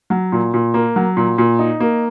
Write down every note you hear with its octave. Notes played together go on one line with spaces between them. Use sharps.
F#3
A#2
A#2
A#3
F#3
A#2
A#2
D#4
A#3